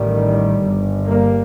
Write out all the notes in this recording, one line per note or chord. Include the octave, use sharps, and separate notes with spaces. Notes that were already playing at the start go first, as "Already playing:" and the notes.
Already playing: A1 A2 D#3 G3
G1 G2
G3 A#3